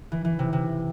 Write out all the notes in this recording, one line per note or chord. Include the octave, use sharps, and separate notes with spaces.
E3
E3
C3
C3